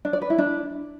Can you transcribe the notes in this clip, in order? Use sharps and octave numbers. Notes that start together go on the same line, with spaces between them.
D4
D5
B4
E4
D4